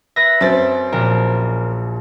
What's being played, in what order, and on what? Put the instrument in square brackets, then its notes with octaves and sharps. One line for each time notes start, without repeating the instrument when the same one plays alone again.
[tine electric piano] B4 E5 [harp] A#6
[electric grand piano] F#2 [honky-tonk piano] C4 A6
[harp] A#1 [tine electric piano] A#4